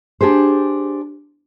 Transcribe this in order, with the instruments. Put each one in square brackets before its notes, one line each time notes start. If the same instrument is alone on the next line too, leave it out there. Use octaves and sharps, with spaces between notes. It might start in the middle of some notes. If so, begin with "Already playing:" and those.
[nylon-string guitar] D4 G4 G#4 C5